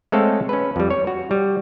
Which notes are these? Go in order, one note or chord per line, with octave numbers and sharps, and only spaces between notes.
G#3 A3 C4 A4 C#5 F5
C#4 B4
F2 G3
C#5
F#4
G3